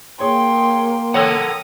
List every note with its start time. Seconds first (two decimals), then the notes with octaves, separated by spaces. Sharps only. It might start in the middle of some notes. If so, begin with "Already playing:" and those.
0.20 A#3 G#4 C#5 G5 C6
1.14 A4 A#4 C#5 F#5 G5 D#6